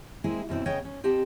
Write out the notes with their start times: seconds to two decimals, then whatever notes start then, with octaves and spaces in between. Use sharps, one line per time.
0.24 G#3 A#3 C4 E4 G#4 C5
0.49 F#2 B2 C4 E4
0.66 C#3 B3 C#5 D#5 G5
0.85 C#4
1.04 C4 G4 D#5 F#5 A5